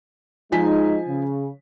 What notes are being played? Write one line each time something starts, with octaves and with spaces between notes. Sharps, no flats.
F3 G#3 D#4 G#5 B6
C#3